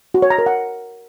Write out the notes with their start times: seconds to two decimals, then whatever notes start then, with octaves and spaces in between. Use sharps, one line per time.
0.14 F#4
0.22 C#5
0.30 A#5
0.38 A#4
0.46 F#5